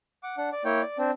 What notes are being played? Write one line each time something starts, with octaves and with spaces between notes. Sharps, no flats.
F#5 D6
D4 F#5
D5
A#3 E4 C#5 G5
D5
C4 D4